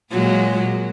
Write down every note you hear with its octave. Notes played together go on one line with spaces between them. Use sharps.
A#2 F#3 G#3